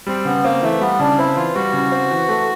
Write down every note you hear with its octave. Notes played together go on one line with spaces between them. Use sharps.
G3 C4
C#3 B3
A#3 C4
E3 A3
G3 B3
C#3 D4
C4 E4
E3 F4
G3 F#4
C#3
C4
E3
A3